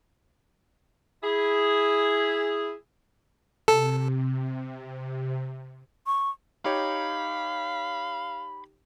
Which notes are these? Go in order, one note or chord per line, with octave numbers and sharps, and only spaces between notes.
E4 G#4
C3 A4
C#6
D#4 G4 C#5 F5 B5